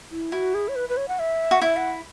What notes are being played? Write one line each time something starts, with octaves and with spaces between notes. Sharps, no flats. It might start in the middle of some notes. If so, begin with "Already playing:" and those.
E4
E4 F#4
G#4
C#5
B4
B4
C#5
F#5
E5
F#4
E4 E5
F#5